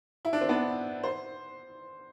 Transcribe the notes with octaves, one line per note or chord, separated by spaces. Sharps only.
E4
D4
C4
B3 D4
C5